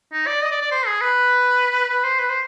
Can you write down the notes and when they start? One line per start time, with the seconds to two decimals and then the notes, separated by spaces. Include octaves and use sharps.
0.12 D#4
0.27 D5
0.42 D#5
0.51 D5
0.61 D5
0.71 C5
0.87 G#4
1.01 B4
1.90 B4
2.04 C5
2.19 B4
2.30 C5